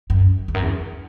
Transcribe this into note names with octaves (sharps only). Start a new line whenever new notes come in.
F#2
E2
F#2
E2